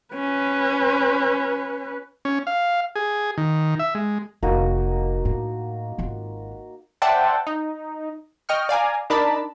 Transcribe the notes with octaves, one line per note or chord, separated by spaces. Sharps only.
C#4 B4
C#4
F5
G#4
D#3
E5
G#3
F1 D#3 A#3 D#4 F#4
A2
G#1 F4
C5 D5 E5 F#5 G5 A5
D#4
D#5 G5 C#6 F6
D5 F5 G#5 A#5
D4 D#4 A#4 D5 A5 B5